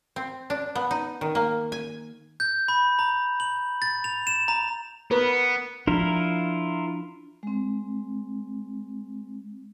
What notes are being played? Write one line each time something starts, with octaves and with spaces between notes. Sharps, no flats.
C4
D4
B3
D#4
D#3
A#3
G#5
G6
B5
A#5
F#7
A6
F7
E7
A#5
B3 A#4 B4
F3 D4 E4 F4 A#4
G#3 C4